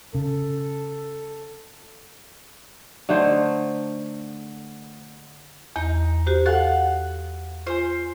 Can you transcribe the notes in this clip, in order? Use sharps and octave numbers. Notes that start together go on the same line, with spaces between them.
C#3 A4
D3 A3 D#4 C5
E2 D#4
F#4 G4 C5
A4 F5 F#5 G#5 F#6
F4 C5 G#5